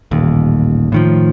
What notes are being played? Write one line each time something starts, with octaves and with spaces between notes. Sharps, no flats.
D#1 A1 D#2
A2 D#3 F3